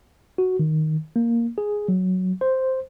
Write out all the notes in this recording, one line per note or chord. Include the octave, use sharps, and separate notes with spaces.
F#4
D#3
A#3
G#4
F#3
C5